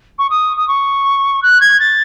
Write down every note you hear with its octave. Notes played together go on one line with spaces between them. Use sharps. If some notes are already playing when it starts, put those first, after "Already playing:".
C#6
D#6
D#6
C#6
F#6
G#6
A6